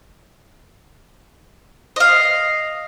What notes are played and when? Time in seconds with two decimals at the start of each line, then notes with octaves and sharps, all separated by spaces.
1.96 D#5 F5